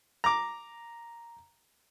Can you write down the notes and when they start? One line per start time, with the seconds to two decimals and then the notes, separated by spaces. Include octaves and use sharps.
0.24 A#5 D6